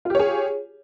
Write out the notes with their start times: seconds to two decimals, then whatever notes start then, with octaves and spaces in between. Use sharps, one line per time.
0.05 F4
0.10 G4
0.15 C#5
0.19 G#4